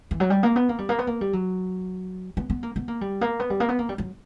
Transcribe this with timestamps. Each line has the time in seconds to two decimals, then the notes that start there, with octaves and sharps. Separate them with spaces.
0.11 E3
0.20 F#3
0.30 G3
0.43 A#3
0.56 B3
0.69 A#3
0.78 G3
0.89 A#3
0.99 B3
1.07 A#3
1.21 G3
1.33 F#3
2.37 B3
2.50 B3
2.63 A#3
2.76 B3
2.88 A#3
3.01 G3
3.21 A#3
3.40 B3
3.50 G3
3.60 A#3
3.69 B3
3.79 A#3
3.89 G3
3.98 F#3